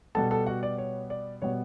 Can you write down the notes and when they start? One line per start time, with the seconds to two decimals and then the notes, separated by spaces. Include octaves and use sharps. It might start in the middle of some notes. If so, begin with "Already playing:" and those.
0.15 B2 G3 B3 A4 A5
0.31 A4 A5
0.47 F#4 F#5
0.63 D5
0.78 C#5
1.10 D5
1.42 B2 G3 B3 C#5